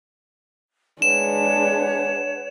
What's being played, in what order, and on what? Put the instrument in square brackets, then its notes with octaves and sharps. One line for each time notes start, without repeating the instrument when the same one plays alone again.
[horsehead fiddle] G#3 D4 [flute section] B4 C#5 F#5 [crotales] E7